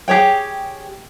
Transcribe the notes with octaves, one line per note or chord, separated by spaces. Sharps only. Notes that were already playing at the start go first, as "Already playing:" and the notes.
G4 G#4 C#5 G5